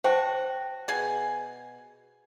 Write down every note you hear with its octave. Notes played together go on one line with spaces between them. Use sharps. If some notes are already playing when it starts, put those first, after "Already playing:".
F#4 C5 G5 A5
B2 G#4 G#5